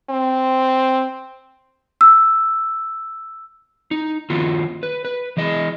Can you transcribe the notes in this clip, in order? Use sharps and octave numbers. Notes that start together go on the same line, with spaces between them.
C4
E6
D#4
D#3 A#3 F4 F#4
B4
B4
E3 G#3 D#5